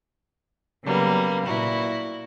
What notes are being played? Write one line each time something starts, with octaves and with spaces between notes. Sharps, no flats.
C#3 F#3 G3 A#3 B3
A#2 E4 F#4